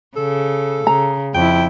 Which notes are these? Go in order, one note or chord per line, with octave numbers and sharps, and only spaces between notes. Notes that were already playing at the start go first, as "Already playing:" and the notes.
C#3 A4
C#3 A#5
F2 E4 G5